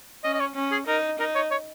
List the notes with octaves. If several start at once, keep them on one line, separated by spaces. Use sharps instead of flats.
C#4 D#5
D#5
C#5
C#4
G#4
D#4 A#4
D#4 A#4
C#5
C#5